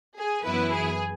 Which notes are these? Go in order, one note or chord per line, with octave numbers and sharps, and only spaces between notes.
G#4
F#2 E3 B3 E4 B4
G#4